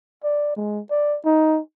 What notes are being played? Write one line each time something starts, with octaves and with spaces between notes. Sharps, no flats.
D5
G#3
D5
D#4